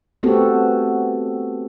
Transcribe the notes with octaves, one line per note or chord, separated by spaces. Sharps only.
A3 B3 C4 F#4 G4 A4